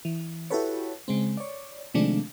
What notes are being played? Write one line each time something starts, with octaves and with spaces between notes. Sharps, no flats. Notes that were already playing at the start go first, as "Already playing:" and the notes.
E3
E4 F#4 G4 A4 B4 C#5
C#3 G#3 C4
C#5 D5
C3 D#3 F3 G#3 A3 D4